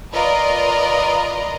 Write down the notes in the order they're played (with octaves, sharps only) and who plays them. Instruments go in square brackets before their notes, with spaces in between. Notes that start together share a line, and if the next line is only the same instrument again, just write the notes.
[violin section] F4 A#4 B4 D5 D#5 A#5